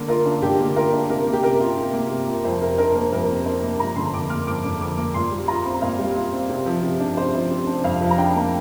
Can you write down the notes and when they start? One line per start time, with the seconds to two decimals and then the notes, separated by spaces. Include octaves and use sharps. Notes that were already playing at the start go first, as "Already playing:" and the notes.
Already playing: D3 A#3
0.08 F4 A#4
0.26 D4
0.42 D3 G4
0.59 A#3
0.76 F4 A#4
0.93 D4
1.10 C3 A#4
1.27 A#3
1.33 G4
1.43 C3 A#4
1.60 F4
1.77 C3
1.94 A#3
2.11 C3
2.28 F4
2.44 F2 C5
2.62 C3 A#4
2.78 D4 A#4
2.95 A#3 A#4
3.12 F2 A#4
3.29 C3
3.46 D4 C5
3.63 A#3
3.80 F2 A#5
3.96 D3 C6
4.13 F2 D6
4.30 A#3 F6
4.47 F2 D6
4.64 D3
4.81 F2 D6
4.97 A#3
5.14 A#2 C6
5.32 G3
5.48 F4 A#5
5.65 C4
5.82 A#2 F5
5.99 G3
6.16 F4
6.32 C4
6.49 C3
6.66 F3
6.83 C3
7.00 D4
7.17 C3 C5
7.34 F3
7.51 C3
7.67 D4
7.84 F2 F5
8.01 F3
8.11 A#5
8.18 D4 G5
8.35 A#3